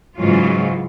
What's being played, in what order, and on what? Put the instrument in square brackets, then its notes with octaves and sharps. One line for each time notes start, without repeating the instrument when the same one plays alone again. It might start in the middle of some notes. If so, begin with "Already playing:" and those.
[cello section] G#2 C#3 E3 F#3 F4